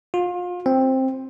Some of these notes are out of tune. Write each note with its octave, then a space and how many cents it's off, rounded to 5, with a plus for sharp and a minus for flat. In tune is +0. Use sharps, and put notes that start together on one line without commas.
F4 +30
C4 +10